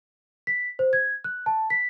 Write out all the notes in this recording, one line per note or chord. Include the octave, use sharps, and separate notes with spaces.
B6
C5
G#6
F#6
A5
B6